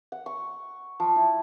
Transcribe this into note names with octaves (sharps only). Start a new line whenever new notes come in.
F#5
C#6
F3
E4